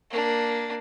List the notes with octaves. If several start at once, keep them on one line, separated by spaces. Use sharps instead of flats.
A#3 D4